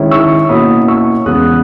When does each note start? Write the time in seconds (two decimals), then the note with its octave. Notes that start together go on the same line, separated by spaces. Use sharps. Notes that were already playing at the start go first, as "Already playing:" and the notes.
Already playing: D#3 G#3 C#4 E4
0.11 C#6 E6
0.49 B2 A#3 C#4 E4 B5 D#6
0.88 C#6 E6
1.26 E2 C#3 G#3 B3 D#6 F#6